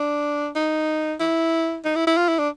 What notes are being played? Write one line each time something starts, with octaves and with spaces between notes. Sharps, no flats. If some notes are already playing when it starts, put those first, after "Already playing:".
Already playing: D4
D#4
E4
D#4
E4
E4
F4
E4
D4